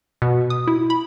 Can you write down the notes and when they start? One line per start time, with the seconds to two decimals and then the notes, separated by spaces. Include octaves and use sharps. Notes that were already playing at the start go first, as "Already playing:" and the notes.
0.22 B2
0.50 D#6
0.68 E4
0.90 B5